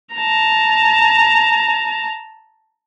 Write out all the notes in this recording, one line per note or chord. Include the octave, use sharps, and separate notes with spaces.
A5 A#5